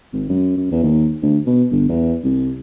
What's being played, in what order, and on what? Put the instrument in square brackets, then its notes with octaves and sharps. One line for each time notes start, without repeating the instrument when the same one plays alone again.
[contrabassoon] G#1
F#2
F#2
E2
D#2
D2
B2
G1
E2
C2